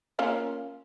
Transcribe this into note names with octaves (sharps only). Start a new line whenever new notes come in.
A#3 C#4 F4